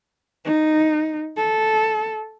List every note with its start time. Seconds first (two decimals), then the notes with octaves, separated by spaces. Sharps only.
0.45 D#4
1.37 A4